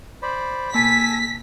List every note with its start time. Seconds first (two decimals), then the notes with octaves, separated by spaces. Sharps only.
0.22 C5 D5 B5
0.75 B2 A#3 G#5 A5 E6 B6